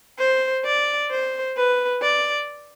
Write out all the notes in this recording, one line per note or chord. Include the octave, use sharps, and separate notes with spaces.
C5
D5
C5
B4
D5